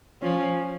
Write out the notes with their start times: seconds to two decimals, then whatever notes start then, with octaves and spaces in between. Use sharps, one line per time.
0.22 F3 C#4